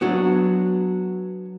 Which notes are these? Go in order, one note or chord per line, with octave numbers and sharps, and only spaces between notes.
F#3 B3 D4 F#4